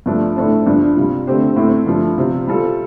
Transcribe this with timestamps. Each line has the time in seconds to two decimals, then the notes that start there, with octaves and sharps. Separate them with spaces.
0.06 G2 F3 A3 D4
0.36 A2 A3 D4 A4 C5
0.66 G2 F3 D4
0.96 C3 G3 F4
1.27 D3 A3 C4 G4 C5
1.56 A2 A3 C4
1.86 G2 F3 A3
2.18 C3 F3 C4 F4
2.47 G3 F4 A4